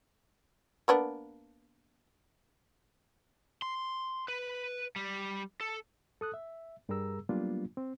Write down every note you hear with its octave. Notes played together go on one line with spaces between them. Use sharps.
A#3 B3 D4
C6
B4
G3
A4
A4 D#6 F#6
E5
G2 G3 G#4 A#4 A#5 E6
F#3 G3 A#3 B3 D4 F4
C4